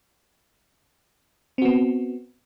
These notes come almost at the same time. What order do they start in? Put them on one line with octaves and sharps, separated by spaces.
C4 F#4 B3